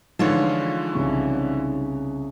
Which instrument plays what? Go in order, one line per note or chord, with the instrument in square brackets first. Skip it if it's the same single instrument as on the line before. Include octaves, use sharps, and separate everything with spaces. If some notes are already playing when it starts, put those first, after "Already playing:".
[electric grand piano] D3 E3 F3 [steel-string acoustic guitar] G#3 F4 C#5 [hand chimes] D#4
[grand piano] C2 C#3 C#6